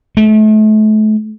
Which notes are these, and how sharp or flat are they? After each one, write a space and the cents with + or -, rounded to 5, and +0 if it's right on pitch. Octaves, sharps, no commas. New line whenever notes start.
A3 -35